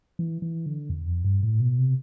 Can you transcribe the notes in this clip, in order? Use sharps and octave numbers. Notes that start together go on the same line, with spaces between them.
E3
E3
D3
E2
F2
G2
A2
B2
C3